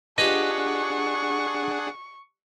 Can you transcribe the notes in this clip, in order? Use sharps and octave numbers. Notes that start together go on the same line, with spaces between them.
D4 F4 G4 G#4 B4 D#5 F#5 C#6